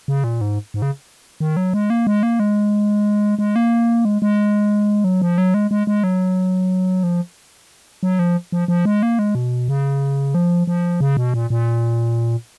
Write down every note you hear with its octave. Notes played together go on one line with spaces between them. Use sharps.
C#3
A#2
G#2
G#2
C#3
D#3
F#3
G#3
A#3
G#3
A#3
G#3
G#3
A#3
G#3
G#3
F#3
F3
F#3
G#3
G#3
G#3
F#3
F3
F#3
F3
F3
F3
G#3
A#3
G#3
B2
C#3
F3
F3
C#3
B2
A#2
A#2